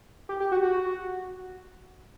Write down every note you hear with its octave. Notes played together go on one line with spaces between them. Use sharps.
G4
G4
F#4
F#4